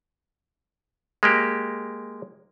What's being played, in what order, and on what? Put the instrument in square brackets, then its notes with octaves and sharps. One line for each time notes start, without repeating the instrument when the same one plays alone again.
[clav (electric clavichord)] G#3 A#3 G4